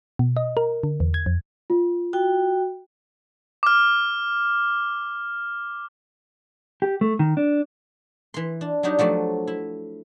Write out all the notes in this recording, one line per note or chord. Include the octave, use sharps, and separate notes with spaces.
B2
D#5
A#4
D3
E2
G#6
F2
F4
F#4 G5
D6 F6
G4
A3
D#3
D4
E3 C6
D4
F#3 G3 D4 D#4 G4
F3 F#3 A3 D5
E4